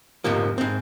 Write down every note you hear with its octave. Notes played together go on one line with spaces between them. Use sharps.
F2 G#2 C3 F3 A#3
G#2 C4